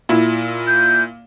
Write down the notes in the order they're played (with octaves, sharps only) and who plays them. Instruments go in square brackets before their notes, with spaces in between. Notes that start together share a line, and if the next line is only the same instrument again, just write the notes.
[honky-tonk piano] A#2 E4
[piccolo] G6